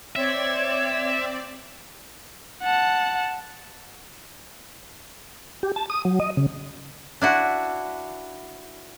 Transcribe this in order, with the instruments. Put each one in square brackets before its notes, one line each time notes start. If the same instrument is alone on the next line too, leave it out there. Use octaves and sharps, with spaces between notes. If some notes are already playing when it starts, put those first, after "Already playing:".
[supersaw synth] C4 D5 [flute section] C#5 [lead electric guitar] E5
[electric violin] F#5 A5
[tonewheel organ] G4
A5
D#6
F#3
D#5
C#3
[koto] D4 E4 F#4